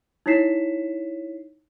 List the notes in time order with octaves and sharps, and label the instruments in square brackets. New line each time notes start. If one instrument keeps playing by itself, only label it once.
[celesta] D#4 E4 C#5 B6 C7 E7